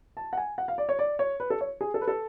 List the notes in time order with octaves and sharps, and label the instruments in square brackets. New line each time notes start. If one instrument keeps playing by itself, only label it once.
[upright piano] A5
F#5
G#5
F#5
F5
D5
C#5
D5
C#5
B4
A4
C#5
G#4
A4
B4
A4